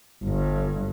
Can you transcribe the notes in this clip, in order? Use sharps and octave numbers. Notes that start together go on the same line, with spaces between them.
G1 G2